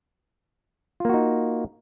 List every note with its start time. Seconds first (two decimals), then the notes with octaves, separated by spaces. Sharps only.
1.00 F4
1.05 A#3
1.09 F#4
1.14 D#4